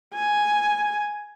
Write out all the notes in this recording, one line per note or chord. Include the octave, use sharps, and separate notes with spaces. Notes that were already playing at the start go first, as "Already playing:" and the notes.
G#5